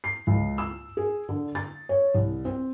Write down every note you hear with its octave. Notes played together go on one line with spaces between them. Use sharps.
C7
C#2
E6
G#4
D3
A6
C#5
C2
C4